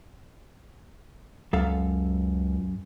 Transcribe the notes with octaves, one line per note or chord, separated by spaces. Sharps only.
C#2 F#2 A4 F5